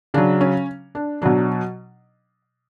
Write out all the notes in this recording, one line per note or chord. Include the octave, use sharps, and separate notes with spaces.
C#3 F#3 D4
C#4
D4
B2 F#3 D4